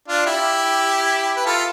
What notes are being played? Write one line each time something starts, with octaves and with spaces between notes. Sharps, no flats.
D4 F4
E4 G4
B4
F4 A4